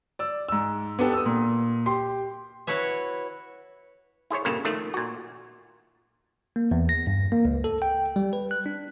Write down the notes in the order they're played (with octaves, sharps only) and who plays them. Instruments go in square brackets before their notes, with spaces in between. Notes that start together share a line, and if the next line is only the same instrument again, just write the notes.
[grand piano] D5 E6
G#2 E6
B3 D4 G4 A4
D#6 E6
A#2
G4 C6
[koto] E4 F#4 B4 C#5 E5
[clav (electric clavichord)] E4 G#4 C5 C#5
G2 A#2 C#3 A#3 A4
D#3 F3 A3
A#2 F#4
[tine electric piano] A#3
E2
A#6
G2
A#3
C#2
A4
G5
G3
B4
F#6
D4